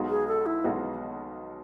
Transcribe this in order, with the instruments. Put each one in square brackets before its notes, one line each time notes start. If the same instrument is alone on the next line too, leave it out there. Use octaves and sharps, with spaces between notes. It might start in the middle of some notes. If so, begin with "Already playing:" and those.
Already playing: [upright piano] B1 B2 G#3 B3 F#4
[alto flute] G#4
A4
E4
[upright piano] B1 B2 G#3 B3 F#4